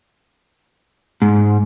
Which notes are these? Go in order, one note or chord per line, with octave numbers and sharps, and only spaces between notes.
G#2